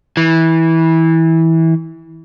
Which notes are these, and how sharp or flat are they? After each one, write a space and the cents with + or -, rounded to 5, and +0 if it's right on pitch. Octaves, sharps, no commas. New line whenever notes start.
E3 -20